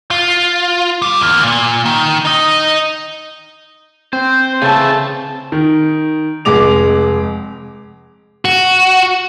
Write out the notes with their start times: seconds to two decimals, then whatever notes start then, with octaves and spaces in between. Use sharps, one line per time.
0.11 F4
1.02 G3
1.21 E2 A#3
1.43 A#2
1.85 D#3
2.25 D#4 D#5
4.13 C4 C5
4.62 C#3 E3 A3 G#4 A5
5.52 D#3
6.45 F1 G#3 D6 F7
8.45 F#4